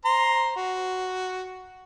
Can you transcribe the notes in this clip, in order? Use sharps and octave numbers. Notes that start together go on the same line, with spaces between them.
C5 A#5 C6
F#4